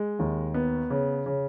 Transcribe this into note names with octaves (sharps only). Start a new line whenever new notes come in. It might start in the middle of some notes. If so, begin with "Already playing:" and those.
Already playing: G#3
D#2
B3
C#3
C#3